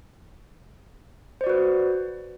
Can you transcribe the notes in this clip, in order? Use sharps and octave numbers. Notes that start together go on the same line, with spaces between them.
F#4 B4 C5 D5